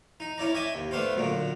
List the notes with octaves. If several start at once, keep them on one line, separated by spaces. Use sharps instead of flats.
D#4
C#4 E4 D5 A#5
D#5 E5 G5 G#5 D6
D#2
A3 B3 D4 C5 F5
F#2 A#2 D3